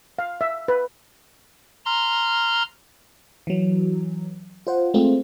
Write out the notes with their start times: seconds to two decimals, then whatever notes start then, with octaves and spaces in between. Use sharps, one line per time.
0.19 F5
0.41 E5
0.68 B4
1.86 A#5 C6 F6
3.47 E3 F#3
4.67 F4 C5 F#5
4.94 G#3 A3 C4 F4